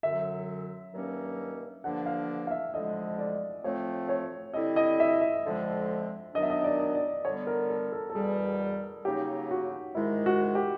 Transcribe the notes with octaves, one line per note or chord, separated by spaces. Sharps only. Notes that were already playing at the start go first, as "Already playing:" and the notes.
F#2 D3 F#3 E5
G2 D#3 F#3 A#3 C#4
G2 D3 F3 A#3 D4 F#5
F5
F5
E5
F2 D3 F3 G#3 D#5
D5
A2 F3 A3 C4 C#5
C#5
D3 G3 C4 E4 D#5
D#5
E5
E5
F2 D3 F3 G#3 C4
F#2 D#3 F#3 B3 D4 D#5
E5
D#5
D5
D5
D3 G3 B3 C#5
A#4
A4
A4
A4
E2 B2 G3 G#4
C#3 F#3 A#3 D#4 G4
F#4
G#2 D#3 G#3 E4
F#4
G4